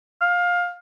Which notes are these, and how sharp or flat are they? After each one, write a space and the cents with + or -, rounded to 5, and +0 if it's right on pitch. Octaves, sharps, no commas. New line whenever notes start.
F5 +20